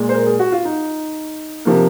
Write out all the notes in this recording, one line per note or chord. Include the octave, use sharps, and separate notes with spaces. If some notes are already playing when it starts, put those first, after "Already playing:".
Already playing: A#2 G#3
C5
A#4
G#4
F#4
F4
D#4
C3 F3 A#3